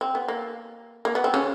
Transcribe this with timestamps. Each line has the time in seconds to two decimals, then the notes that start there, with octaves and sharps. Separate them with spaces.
0.01 C4
0.15 B3
0.28 A#3
1.05 A#3
1.15 B3
1.24 C4
1.34 C#3 C#4